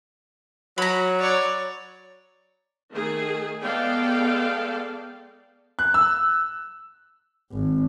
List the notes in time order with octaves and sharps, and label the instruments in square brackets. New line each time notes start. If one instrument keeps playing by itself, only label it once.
[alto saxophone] F#3 [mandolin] A#5 B5
[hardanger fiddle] C#5 D5
[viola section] D#3 A3 G#4
G#3 B3 A4 D5 F5 G5
[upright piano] F#6
E6
[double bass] G#1